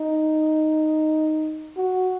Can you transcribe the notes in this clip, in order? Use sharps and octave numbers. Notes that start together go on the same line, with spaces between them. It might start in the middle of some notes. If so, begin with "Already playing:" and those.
Already playing: D#4
F#4